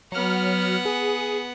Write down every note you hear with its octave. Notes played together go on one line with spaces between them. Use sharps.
F#3 B3 F#5 F6
G#4